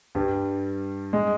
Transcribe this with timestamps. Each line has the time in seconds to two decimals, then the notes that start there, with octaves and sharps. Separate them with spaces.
0.15 G2 G3
1.13 G#3